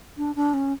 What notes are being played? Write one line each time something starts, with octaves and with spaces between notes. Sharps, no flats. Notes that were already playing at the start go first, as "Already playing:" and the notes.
D4
D4
C#4